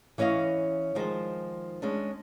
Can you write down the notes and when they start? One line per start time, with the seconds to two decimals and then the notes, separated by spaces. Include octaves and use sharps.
0.18 E3 C#4 C#5 D#5 F5
0.95 D#3 F3 G#3 C5
1.82 G#3 C#4 D4